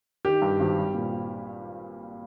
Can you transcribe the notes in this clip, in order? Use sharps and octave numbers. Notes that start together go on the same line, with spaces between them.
D#3 G4
G2
G#1
G3
A#2